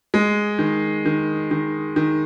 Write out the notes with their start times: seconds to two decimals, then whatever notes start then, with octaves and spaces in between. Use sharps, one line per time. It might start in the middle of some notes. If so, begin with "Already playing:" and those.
0.14 G#3
0.59 D#3
1.05 D#3
1.51 D#3
1.96 D#3